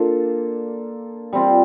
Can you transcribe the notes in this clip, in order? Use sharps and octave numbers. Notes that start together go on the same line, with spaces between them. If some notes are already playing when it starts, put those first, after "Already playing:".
Already playing: A#3 D4 F4 A4
G3 C4 F4